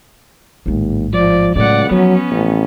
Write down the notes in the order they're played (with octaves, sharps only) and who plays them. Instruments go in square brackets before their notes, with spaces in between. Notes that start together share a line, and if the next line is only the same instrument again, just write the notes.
[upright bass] A1 G#2 [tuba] D#2
[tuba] F3 [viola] D5
[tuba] C#2 [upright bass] A2 F#3 [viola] D5 F#5
[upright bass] F3 [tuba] F#3 [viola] B3 C#4
[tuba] A1